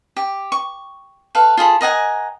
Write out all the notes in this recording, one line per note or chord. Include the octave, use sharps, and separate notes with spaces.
G4
C#6
A4 B4 F5
F4 G#4 A4 B5
A#4 D#5 F#5 G#5